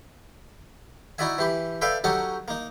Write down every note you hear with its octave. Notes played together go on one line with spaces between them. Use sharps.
D#4 E4 F#4 D5 E5 G#5
E3 G4 B5
A4 B4 D5 E5 F5 G5
F#3 C#4 D#4 G4 A4 F#5
A#3 D#4